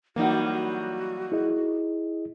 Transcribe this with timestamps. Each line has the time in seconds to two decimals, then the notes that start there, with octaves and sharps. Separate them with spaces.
0.16 E3 F#3 G3 A#3 D#4 F#4
1.32 E4 G#4 D#5